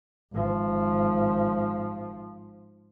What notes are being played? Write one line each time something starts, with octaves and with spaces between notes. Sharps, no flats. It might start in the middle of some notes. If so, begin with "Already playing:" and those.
G#1 F3